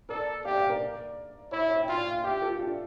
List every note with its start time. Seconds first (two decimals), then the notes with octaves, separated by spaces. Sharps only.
0.09 A4 A#4 D5
0.45 G4 D5 F5
0.57 D5 F5
0.69 A#4 D5
1.52 E4 C#5 E5
1.70 C#5 E5
1.82 G5
1.88 F4 D5 F5
2.23 G4 E5 G5
2.42 F4 A4
2.52 G4
2.59 D4 F4